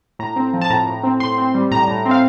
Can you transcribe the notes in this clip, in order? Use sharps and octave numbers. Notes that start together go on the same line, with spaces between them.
A2 A#5
C4
F3
A5
A2 A#5
A2
C4
A2 C6
C4
G3
A2 A#5
A2
C4
F5